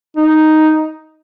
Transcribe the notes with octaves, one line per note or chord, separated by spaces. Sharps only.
D#4